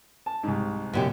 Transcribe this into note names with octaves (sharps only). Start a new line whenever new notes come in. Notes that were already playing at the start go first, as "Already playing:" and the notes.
A5
C2 G#2
C#2 F#2 B2 G4 C#5